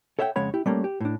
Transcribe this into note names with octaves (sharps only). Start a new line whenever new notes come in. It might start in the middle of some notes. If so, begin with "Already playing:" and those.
A4 C#5 E5 F#5 G5
F2 C#3 G#3 C#5 F#5 B5
E4 G4
G3 A3 A#3 C#4
G4
A2 D4